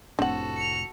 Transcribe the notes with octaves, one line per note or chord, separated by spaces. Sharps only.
F1 A2 C4 D4 F#4 A4 F#5
C#7 F7